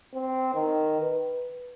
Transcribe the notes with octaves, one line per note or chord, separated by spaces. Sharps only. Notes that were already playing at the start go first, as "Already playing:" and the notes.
C4
D#3
B4